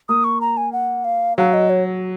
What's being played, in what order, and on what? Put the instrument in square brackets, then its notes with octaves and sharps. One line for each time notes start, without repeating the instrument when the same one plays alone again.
[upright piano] A#3 [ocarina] D#6
[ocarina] C#6
A#5
G#5
F#5
F5
[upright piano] F#3 [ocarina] F5
[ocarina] D#5
C#5